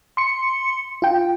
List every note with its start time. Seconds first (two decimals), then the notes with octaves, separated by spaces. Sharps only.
0.17 C6 C#7
1.02 F4 G5